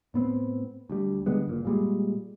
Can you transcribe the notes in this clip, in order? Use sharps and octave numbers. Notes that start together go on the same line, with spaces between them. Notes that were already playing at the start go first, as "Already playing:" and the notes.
A2 B3 C4
D2 G3
D3 G3 G#3 B3
F#1 A#2
A#2 G3 G#3